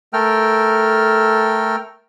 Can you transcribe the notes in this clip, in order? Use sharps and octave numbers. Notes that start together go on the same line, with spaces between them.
A3 A4 A#4 G5 F6